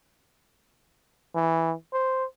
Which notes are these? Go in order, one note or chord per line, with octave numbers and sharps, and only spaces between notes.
E3
C5